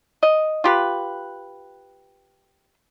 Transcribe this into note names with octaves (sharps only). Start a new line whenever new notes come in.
D#5
F4 G4 B4